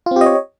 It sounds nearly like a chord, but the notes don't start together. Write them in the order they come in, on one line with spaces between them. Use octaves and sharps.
F4 C4 G4 D#5 C#5